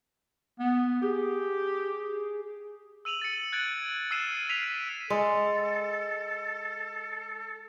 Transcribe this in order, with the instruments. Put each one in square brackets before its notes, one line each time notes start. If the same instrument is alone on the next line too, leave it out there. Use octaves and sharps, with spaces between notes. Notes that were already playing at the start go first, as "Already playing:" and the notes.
[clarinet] B3
[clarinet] G4 [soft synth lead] G#4
[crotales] E6 D#7 F7 F#7
A6 C#7
F#6 G#6 A6 D7 F#7
E6 F6 A6 C7 D#7 E7
F6 B6 C7 D7 D#7 F7
[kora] G#3 [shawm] A4